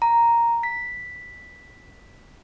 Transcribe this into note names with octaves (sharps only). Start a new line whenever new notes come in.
A#5
B6